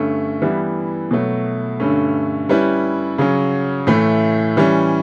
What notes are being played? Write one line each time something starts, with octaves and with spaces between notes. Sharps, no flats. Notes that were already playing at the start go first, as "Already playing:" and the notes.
Already playing: G2 D3 A3 C#4
E3 G3 B3 E4
B2 F#3 A3
G2 D3 A3 C#4
G3 C#4 E4 B4
C#3 F#3 C#4
A2 E3 A3
E3 G3 C#4